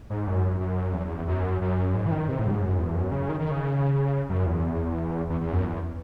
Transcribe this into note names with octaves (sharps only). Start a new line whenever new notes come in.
G#2
F#2
F#2
E2
F#2
F#2
G#2
E3
D#3
C3
A2
F#2
G#2
F#2
E2
F#2
C#3
D#3
D#3
C#3
F#2
E2
E2
E2
F#2
E2